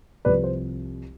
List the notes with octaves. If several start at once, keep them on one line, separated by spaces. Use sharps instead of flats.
C2 C3 F3 B4 D5
C5